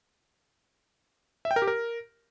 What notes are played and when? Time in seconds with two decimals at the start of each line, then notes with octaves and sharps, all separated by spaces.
1.45 E5
1.51 G5
1.56 A#4
1.62 G4
1.67 A#4